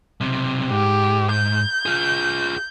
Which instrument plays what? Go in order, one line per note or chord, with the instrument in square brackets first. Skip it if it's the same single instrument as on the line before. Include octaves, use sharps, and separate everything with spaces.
[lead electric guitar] B1 C3
[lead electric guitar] G#2 [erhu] G4
[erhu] G6
[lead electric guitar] F4 G#4